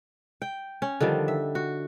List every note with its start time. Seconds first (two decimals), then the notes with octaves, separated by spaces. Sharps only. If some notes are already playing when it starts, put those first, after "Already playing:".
0.42 G5
0.82 C#4
1.01 D3 D#3 F3 G3
1.28 E5
1.55 F#4